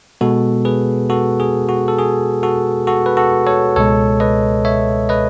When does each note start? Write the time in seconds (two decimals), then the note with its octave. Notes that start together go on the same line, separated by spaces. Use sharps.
0.21 B2 G#3 B3 F#4 A4
0.65 G#4 B4
1.10 F#4 A4
1.40 G#4
1.69 F#4
1.88 A4
1.98 G#4
2.43 F#4 A4
2.87 F#4 A4
3.06 B4
3.17 F#4 A4
3.47 A4 C#5
3.76 C#2 B2 G#3 A4 C#5
4.20 B4 D#5
4.65 C#5 E5
5.09 B4 D#5